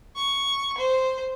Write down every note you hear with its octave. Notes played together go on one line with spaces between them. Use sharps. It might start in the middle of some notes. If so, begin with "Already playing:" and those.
C#6
C5